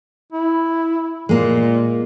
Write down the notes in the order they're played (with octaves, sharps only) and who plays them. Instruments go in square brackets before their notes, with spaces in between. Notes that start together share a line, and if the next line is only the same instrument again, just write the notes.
[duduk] E4
[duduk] A#2 [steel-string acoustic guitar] G#3 A#3